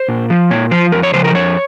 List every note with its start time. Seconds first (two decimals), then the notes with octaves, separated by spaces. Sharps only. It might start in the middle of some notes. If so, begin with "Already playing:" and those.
Already playing: C5
0.08 A#2
0.30 F3
0.51 A#2 C#5
0.71 F3 C5
0.92 F2 A#4
1.03 C#5
1.14 C#3 F3 C5
1.24 A#4
1.35 F2 C#5